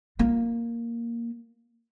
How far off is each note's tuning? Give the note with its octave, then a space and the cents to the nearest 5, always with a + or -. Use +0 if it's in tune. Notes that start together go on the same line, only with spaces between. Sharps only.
A#3 +0 F4 +0